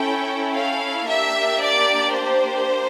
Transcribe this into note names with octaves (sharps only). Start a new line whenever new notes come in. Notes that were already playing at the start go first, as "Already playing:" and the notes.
Already playing: C#4 E4 A4 G5
F5
A#3 D4 G4 E5
D5
C5